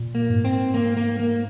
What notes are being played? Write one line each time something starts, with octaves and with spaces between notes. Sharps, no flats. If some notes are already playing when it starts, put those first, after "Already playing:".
Already playing: A#2
A#3
G#2
C4
A#3
A#3
A#3